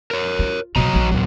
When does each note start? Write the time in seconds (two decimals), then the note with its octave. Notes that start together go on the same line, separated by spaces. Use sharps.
0.11 A#4 C#5
0.39 F4
0.76 B2 F#3 F4 D#5 A#5
0.93 A#1 E3
1.11 D#2 A#2 F#3